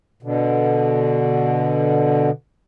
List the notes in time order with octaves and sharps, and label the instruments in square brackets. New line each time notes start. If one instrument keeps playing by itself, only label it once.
[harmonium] B2 D3